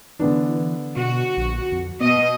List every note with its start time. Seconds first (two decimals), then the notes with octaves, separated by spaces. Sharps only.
0.19 D3 E3 B3 D4
0.97 B2 F#4
1.37 A#1
1.72 F2
2.00 B2 B3 D#5